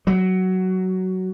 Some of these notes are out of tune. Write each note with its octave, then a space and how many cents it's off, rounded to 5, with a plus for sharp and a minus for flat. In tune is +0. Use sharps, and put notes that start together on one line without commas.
F#3 +10